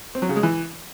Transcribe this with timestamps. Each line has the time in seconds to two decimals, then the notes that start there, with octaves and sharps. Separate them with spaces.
0.15 C4
0.22 F#3
0.29 C#3
0.36 G#3
0.43 E3